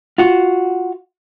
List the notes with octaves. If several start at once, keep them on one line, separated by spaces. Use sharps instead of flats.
F4 F#4